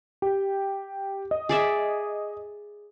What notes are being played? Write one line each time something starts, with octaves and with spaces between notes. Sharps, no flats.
G4 G5
D#5
G#4 D5 E5